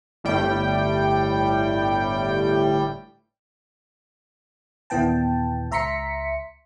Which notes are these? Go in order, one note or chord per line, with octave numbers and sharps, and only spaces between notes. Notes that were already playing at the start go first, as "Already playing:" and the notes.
G1 A2 G3 G5
D#2 A#2 E3 B3 G5 A5
C#2 E5 A#5 C6 B6 C#7